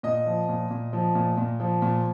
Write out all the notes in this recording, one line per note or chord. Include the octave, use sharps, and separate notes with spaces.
A#2 D#5
F3
A#2
A#2
F3
A#2
A#2
F3
A#2